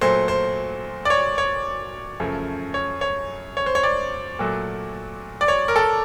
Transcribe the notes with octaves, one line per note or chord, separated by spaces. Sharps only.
A#2 F#3 A3 C5
C5
D5
C#5
C#5
F#2 C#3 F3 A3
C#5
C#5
C#5
C5
C#5
D5
A#2 F#3 A3
D5
C#5
A#4
A4